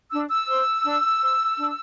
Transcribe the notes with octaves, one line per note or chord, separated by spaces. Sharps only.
D4 E6
E6
C5
D4
C5
D4